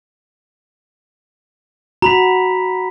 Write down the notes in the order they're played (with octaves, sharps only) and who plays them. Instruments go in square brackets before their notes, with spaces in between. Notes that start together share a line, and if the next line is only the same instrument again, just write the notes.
[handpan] F#4 [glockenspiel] A#5 B5 B6